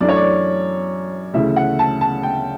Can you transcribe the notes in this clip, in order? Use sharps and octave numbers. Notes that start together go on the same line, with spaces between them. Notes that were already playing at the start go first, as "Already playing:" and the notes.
F#2 E3 A3 D4 D5
C#5
D5
D2 C#3 E3 A3 E4 E5
F#5
A5
A5
G5